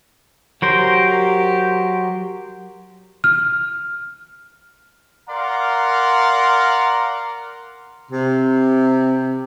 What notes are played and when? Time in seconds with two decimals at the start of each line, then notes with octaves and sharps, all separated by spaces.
0.62 F#3 G4 A#4 C5
3.24 F6
5.29 A#4 D5 F5 F#5 A#5 C6
8.11 C3